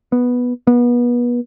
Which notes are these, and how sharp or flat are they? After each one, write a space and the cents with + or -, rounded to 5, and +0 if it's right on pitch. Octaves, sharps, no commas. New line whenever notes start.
B3 -5
B3 -30